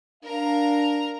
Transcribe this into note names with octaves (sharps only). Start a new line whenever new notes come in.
D4 A#4 F5 A#5